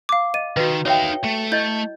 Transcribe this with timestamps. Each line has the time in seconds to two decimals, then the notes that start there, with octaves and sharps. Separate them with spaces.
0.09 F5 D6
0.34 D#5 D#7
0.57 D#3 F#4 B4
0.86 D#4 C#5 E5 F5 G5
1.24 A3
1.52 E4 D#5 G6